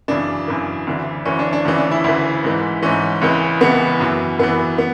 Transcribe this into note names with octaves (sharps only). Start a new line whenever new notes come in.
F#2 C#3 E3 D4
F#2 C#3 E3
D2 C#3 E3
D2 C#3 E3 C#4
D4
D4
D2 C#3 E3 C#4
D4
E4
D2 C#3 E3 E4
G#2 E3
G#2 E3 C#4
C#2 C#3 E3
C#2 C#3 E3 B3
F#2 E3
F#2 E3 B3
B3